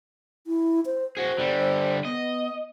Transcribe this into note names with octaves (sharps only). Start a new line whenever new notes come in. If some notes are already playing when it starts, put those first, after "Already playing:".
E4
C5
F#4 G#4 C5
D3 G3
B3 D#5